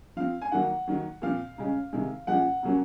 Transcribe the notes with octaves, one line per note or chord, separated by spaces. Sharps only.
F3 C4 F5
G#5
D#3 F#3 A#3 F#5
D#3 F#3 A#3
A#2 F3 C4 F5
C#3 G#3 C#4
C3 D#3 G#3
A#2 F3 G#3 C#4 F#5
C#3 F#3 A#3 C#4